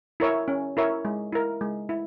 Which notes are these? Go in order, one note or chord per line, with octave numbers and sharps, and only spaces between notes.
E4 A#4 C#5 E5
C#4
E4 A#4 C#5 E5
G#3
E4 A#4
G#3
E4